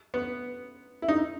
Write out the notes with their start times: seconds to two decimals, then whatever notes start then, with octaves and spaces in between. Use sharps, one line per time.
0.14 B3
1.02 E4
1.08 D#4